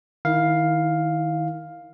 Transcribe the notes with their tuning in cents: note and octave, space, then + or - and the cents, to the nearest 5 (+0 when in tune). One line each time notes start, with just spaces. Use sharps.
D#3 +0 E4 -20 F5 +5